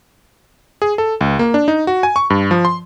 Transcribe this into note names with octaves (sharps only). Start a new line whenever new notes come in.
G#4
A4
C#2
A#3
D4
D#4
F#4
G#5
C#6
G2
F3
C6